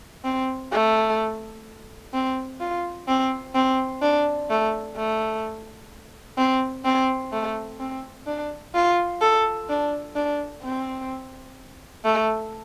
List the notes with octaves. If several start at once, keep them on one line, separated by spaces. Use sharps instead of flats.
C4
A3
C4
F4
C4
C4
D4
A3
A3
C4
C4
A3
C4
D4
F4
A4
D4
D4
C4
A3